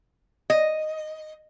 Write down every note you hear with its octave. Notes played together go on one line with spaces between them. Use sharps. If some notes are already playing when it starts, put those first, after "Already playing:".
D#5